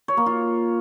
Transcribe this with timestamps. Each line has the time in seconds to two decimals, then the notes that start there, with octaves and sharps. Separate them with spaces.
0.08 C#5
0.17 A#3
0.26 F4